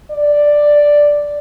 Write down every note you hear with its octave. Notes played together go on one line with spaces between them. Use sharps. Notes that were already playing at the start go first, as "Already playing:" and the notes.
D5